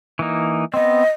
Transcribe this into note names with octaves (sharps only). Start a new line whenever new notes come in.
E3 A#3 D#4
B3 C4 D#5